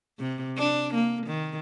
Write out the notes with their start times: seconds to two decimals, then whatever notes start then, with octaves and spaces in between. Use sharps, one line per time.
0.19 C3
0.57 D4
0.94 A#3
1.27 D#3